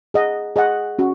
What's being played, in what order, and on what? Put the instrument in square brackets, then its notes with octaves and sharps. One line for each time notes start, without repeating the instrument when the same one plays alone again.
[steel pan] G#4 D#5 F#5
G#4 D#5 F#5
C#4 F#4